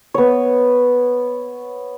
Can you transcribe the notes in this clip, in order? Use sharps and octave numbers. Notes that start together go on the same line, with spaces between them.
B3 C#5